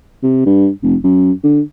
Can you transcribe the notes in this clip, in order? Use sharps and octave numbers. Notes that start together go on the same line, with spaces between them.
C3
G2
F1
F#2
D3